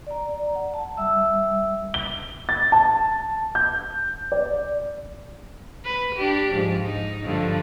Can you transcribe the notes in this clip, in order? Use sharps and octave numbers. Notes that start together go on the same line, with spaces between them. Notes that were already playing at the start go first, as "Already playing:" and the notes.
D5 A#5
F#5
A5
G3 E5 E6
G7
A6
A5
G6
D5
B4
D4 G4
G#2 F3
D#4
G2 D3 F3